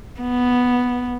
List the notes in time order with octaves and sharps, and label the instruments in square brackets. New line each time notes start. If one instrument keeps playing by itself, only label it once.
[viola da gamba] B3